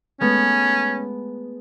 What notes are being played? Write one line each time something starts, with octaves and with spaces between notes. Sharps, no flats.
G#3 A3 B3 C#4